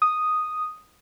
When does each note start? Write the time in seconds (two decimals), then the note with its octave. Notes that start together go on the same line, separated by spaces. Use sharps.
0.02 D#6